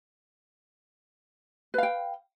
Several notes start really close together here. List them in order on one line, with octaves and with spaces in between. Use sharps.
B4 F5 G5